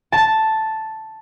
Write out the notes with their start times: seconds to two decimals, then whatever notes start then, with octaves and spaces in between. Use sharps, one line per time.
0.12 A5